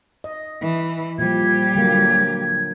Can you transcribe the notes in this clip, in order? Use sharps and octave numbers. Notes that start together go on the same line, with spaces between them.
D#5
E3
A#2 F3 G3 G4 G#6
D3 F#3 A#3